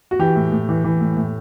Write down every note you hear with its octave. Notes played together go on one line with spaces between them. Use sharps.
F#4
E3 G4
A2
A2
E3
E3
A2
A2